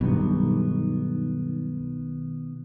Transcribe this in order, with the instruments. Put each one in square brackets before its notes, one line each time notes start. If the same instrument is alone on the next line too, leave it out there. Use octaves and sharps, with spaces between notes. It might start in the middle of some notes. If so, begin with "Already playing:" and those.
[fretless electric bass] B1 G2 [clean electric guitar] B2 D#3 B3